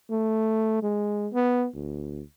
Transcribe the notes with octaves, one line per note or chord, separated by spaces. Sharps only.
A3
G#3
B3
D2